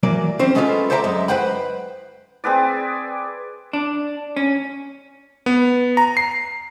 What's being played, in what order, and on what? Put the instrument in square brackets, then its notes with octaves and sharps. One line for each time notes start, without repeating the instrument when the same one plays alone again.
[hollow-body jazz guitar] E3 F#3 A#3 D5
C4 C#4 C5
G#3 B3 C#4 D#4 F4 A4
A4 C5 D5 E5 G5 A#5
F#2 G#3
B4 C5 F#5 G5 B5
[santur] C4 G#4 B4 D5
[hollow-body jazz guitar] D4
C#4
[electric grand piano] B3
A#5
C7